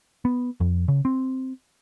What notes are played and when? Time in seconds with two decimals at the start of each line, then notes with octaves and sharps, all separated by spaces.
0.25 B3
0.60 F2
0.88 C#3
1.05 C4